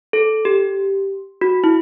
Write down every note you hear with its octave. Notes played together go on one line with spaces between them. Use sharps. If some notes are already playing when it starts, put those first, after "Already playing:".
A4
G4
F#4
E4